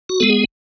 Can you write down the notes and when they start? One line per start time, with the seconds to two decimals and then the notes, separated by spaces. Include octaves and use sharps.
0.09 F#4
0.20 G#3 B3 A4
0.30 G#4